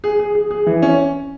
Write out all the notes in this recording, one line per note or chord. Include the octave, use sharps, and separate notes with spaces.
G#4
G#4
G#4
G#4
E3
C#4